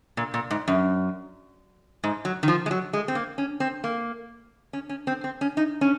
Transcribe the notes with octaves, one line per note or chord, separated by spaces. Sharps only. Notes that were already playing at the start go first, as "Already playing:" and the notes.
A#2
A#2
G#2
F#2
G#2
F#3
D#3
F3
G#3
F#3
G#3
C4
A#3
C#4
C4
A#3
C#4
C#4
C4
C4
C#4
D#4
C#4